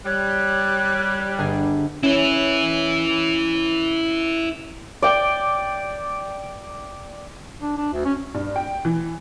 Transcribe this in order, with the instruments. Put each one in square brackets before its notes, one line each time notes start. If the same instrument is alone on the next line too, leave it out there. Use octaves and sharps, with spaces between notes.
[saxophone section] G3 [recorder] C#5 [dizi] F#6
[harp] G1 G#4
[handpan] C#4 [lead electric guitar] E4 B4
[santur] D5 G5
[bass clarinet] D4
D4
D2
C#4
[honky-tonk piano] G2
G5
E3